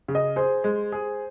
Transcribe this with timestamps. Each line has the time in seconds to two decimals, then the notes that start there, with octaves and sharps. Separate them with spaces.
0.08 C#3
0.15 D#5
0.36 G#4 C5
0.64 G#3
0.92 G#4